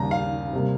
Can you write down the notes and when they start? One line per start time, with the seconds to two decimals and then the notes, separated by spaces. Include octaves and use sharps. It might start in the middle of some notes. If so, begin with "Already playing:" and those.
Already playing: D#2 C#3 G3 A#5
0.11 F5
0.53 C3 G3 A#3